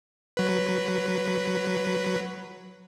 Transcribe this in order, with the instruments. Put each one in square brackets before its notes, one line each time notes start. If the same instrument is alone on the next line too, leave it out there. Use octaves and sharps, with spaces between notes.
[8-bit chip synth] F#3 B4